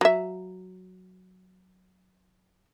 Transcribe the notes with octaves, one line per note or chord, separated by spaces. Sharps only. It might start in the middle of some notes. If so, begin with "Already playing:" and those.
F#3 E5